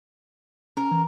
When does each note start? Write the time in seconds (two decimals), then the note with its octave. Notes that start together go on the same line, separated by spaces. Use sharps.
0.77 C#4 A#4
0.91 E3